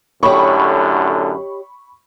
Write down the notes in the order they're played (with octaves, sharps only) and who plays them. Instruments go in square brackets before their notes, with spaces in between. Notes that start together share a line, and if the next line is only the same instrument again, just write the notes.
[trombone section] F#2 A2 D3 [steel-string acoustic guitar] G4 C#5 D#5 [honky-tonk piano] B5 C#6